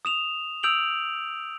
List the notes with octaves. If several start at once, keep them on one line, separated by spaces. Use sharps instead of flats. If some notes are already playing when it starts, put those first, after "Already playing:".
D#6 E7 F7
D#6 E6 G6 D7 F7 F#7